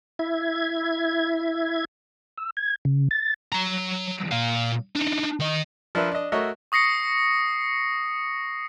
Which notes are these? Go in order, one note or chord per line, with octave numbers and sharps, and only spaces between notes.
E4 E5 G#6
E6
G#6
C#3
A6
F#3 A#5
A#2 F5
D4 D#4
D#3 D#5
F3 D4 A#4 B4 E5
D4 D#5
A3 F#4 A#4 C#5 D#5 E5
C#6 D#6 A#6 C7 C#7